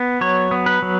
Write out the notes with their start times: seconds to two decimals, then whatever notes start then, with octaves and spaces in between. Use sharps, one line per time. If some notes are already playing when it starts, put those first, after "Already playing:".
Already playing: B3
0.21 F#3 C#5
0.51 B3
0.66 B4
0.82 F#3